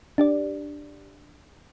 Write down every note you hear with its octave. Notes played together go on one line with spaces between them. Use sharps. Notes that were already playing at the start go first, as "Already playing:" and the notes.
D4 G4 D5